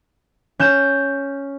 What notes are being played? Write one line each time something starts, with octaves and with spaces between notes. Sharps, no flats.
C#4 G6 E7